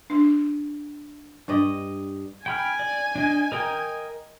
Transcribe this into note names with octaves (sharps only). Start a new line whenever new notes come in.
D4
G2 D5 D#5
G5 G#5 B5 F6
D5
D4 D#5
A#4 D#5 G5